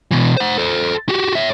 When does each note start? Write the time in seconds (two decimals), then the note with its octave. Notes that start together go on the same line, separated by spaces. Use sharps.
0.11 B2 E3
0.37 C5 F#5
0.58 A4 C5
1.09 F#4 G4
1.35 C#5 E5